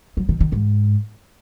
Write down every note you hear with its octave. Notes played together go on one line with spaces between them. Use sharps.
F#3
D#3
D#3
G#2